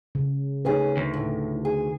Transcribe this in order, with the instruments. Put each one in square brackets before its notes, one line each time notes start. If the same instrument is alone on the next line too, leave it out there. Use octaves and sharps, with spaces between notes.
[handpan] C#3
[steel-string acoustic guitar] D2 C#4 G#4 [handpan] D#4 B4
[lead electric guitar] D2
[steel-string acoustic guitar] A2
G#4